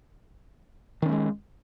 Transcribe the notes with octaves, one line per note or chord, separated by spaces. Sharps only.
D#3 G#3 A3 C#4